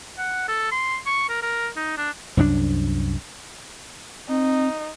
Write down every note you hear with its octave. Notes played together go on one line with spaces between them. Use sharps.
F#5
A4
C6
C#6
A#4
A#4
D#4
D4
C2 F#2 G#3 D4
C4 D#4